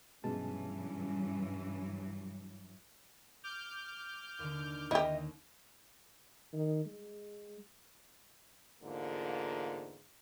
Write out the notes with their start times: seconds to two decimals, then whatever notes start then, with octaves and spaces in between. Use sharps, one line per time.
0.24 G2 B2 E3 F#3 G#3 C#4 A5
3.44 D6 F6 G6
4.39 D#2 D3
4.91 D#2 E4 G4 D#5
6.53 D#3
6.86 G#3
8.82 E2 G#2 D3 A#3 F4